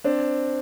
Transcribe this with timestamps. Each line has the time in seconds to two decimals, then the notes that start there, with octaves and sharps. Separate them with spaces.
0.04 C4 D4